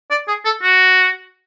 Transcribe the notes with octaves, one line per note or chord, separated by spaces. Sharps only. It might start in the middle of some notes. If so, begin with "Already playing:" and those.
D5
G#4
A4
F#4